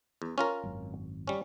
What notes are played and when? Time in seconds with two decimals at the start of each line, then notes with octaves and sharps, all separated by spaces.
0.22 E2
0.38 C#4 F4 A#4
0.63 G#1 F#2
1.27 G3 C#4